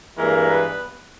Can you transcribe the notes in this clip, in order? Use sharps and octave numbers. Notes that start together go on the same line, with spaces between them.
G2 E3 G#3 A#3 A#4
B3 B4